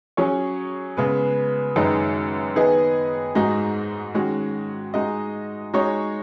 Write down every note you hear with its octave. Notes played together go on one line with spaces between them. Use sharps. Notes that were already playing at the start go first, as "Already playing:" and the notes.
F#3 C#4 G#4 C#5
C#3 G#3 B3 G#4 B4
F#2 D#3 G#3 D#4 B4
D#3 B3 G#4 B4 D#5
G#2 G#3 D#4 F#4
D#3 G#3 C#4 F#4
G#3 D#4 F#4 D#5
G#3 D#4 F#4 C#5